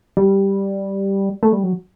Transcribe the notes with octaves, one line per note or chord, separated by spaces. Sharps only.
G3
A3
G3
F#3